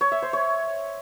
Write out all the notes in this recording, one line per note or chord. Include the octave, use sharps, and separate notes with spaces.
C#5
E5
C5
C#5